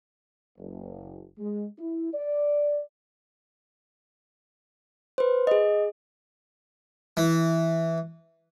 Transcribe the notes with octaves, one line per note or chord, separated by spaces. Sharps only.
F#1
G#3
E4
D5
B4 C5
G#4 D#5
E3